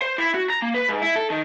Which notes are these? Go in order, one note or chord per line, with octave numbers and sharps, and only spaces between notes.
C5
E4
F#4
A#5
A#3
B4
G#2
E4
A4
D#3